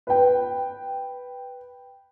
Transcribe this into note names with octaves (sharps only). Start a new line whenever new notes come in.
B4 G5